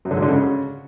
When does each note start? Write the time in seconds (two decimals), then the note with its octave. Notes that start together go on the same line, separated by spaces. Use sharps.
0.05 F#2
0.11 D3
0.17 G#2
0.22 D3
0.28 C#3